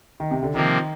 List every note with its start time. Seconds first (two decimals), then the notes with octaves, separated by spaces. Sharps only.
0.20 D#3
0.31 C3
0.43 D3
0.54 C3 D#3 F3 A#3